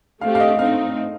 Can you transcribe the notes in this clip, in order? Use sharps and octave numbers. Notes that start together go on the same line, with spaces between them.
A3 C4 G4 F5
F5
D#5
A3 C4 D#4 F5